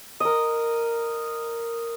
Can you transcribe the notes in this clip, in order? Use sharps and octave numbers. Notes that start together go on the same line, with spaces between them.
A#4 D#5